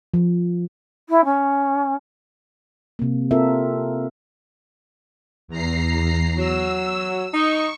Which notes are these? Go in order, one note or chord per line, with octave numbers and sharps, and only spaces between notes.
F3
E4
C#4
C3 A#3
C4 F4 A4 A#4 E5
E2 A#5 C7
F#3 E6
D#4 C#6